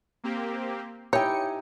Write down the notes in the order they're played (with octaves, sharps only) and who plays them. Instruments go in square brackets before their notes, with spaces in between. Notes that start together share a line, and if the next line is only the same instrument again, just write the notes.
[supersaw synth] A#3 C4 G4
[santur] D#4 E4 G#5 [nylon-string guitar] G4 G5 [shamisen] C#5 [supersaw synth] C#7